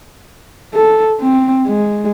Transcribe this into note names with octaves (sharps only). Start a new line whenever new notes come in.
A4
C4
G#3